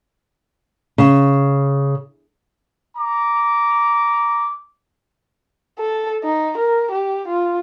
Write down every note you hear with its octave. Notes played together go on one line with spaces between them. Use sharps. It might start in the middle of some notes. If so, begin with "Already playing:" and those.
C#3
A#5 D6
A4
D#4
A#4
G4
F4